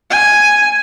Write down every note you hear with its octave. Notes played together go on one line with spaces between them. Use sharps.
G#5